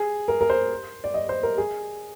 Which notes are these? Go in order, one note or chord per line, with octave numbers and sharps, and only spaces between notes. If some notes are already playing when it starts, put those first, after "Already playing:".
Already playing: G#4
A#4
A#4
C5
D5
D#5
C5
A#4
G#4